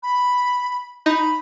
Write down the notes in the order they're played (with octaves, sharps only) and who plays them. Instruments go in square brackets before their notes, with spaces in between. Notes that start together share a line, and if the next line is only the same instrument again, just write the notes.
[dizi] B5
[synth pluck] D#4 [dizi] B5